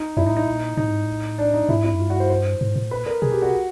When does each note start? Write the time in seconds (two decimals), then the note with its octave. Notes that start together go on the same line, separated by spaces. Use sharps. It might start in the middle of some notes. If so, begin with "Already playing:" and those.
Already playing: D#4
0.17 F2 E4
0.24 G#2 D#4
0.31 A2
0.37 D#4
0.46 A#2
0.77 A2 D#4
0.90 G#2
1.04 A2
1.38 D4
1.54 D#4
1.69 G#2 E4
1.84 E4
1.93 F#2
2.00 G2 F4
2.10 F#4
2.20 C5
2.30 C5
2.61 G#2
2.76 A2
2.91 A#2 B4
3.06 A#4
3.22 B2 G#4
3.32 G4
3.42 F#4